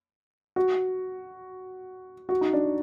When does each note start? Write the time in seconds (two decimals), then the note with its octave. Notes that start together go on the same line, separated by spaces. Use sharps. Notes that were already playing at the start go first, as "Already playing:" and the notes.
0.56 F#4
2.29 F#4
2.41 D#4
2.53 D4